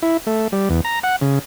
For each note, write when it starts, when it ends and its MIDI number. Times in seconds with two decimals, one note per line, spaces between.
0.02 0.17 64
0.27 0.48 57
0.52 0.69 55
0.70 0.81 40
0.85 0.99 82
1.04 1.16 78
1.21 1.39 49